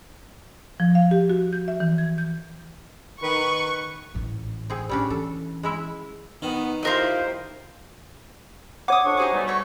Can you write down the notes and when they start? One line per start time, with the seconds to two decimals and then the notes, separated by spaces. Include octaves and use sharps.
0.80 F3
0.95 F5
1.11 G4
1.30 F#4
1.53 G6
1.68 E5
1.80 E3
1.98 G#6
2.18 G6
3.22 D#3 B4 C#6
4.15 A1 G#2
4.70 C4 G#4
4.89 A2 G3 C#4 D4
5.10 E3 A4
5.63 G#3 E4 E5
6.42 D#3 B3
6.83 E4 F4 G4 A#4 C5 D#5
8.88 C#5 F#5 D6 D#6
9.04 F2 D4 C#6
9.17 C3 D#4 F#4 G#4 G#5 D6
9.33 B2 G3 A3
9.48 F#4 C#5 E5